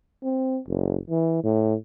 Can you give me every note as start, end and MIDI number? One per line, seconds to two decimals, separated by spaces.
0.23 0.59 60
0.67 0.97 30
1.09 1.41 52
1.43 1.75 45